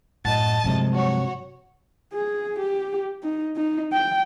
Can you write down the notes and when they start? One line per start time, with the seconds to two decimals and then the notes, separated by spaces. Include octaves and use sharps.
0.25 F#2 A2 D#5 F#5 A5 A6
0.64 G2 C3 F3 F#3 G#3
0.93 F#4 C#5
2.13 G#4
2.59 G4
3.23 D#4
3.56 D#4
3.92 G5